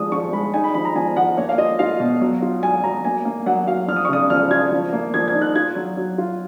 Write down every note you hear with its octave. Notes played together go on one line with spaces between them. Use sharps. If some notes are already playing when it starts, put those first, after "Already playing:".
Already playing: F3 G#3 D#6
F3 C#6
G#3 B5
D#4 G#5
B5
F3 B5
A#5
F3 G#5
F3 F#5
A#3 C#5
F5
F4 D#5
F4 F5
B2
F#3
F4
F#3 G#5
F#3 A#5
A#3 G#5
A#3
F#3 F#5
F#3 F5
F3 F6
D#6
C#6
C#3 D#6
F3 F6
F4 G#6
F3
A#3
F3 G#6
G#6
D#4
F#6
F4 G#6
F#3
F#3
F4